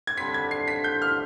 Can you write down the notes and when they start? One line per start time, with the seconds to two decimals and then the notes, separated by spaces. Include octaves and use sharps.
0.07 G#6
0.17 D3 G3 C4 B6
0.34 G#6
0.51 C7
0.68 B6
0.84 G6
1.02 F6